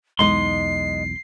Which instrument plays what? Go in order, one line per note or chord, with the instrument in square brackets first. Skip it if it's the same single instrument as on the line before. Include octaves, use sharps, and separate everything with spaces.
[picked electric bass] B1 E2 [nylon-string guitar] G#3 D#4 D#5 [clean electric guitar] C6 [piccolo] C7